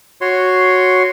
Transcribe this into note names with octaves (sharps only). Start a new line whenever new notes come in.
F#4 C#5 C6